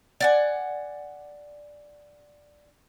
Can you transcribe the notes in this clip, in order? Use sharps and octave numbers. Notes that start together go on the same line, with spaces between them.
D5 F#5 G#5